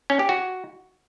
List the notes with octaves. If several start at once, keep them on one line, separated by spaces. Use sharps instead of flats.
C#4
G4
F#4